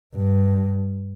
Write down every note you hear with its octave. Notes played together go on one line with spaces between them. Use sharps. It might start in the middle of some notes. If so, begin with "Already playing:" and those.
G2